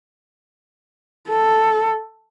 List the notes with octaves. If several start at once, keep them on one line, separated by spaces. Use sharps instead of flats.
A4